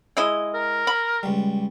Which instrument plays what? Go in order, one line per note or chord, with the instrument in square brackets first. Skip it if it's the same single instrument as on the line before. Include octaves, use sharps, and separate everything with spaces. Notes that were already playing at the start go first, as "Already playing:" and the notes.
[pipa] G#3 E4 D#5
[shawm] A#4
[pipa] B5
[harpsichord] C#2 G3